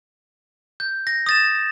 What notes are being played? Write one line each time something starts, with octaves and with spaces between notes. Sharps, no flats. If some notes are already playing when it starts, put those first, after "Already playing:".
G6
A#6
D#6 A6 E7